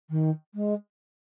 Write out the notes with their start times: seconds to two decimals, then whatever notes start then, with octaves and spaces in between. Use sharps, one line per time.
0.10 D#3
0.55 G#3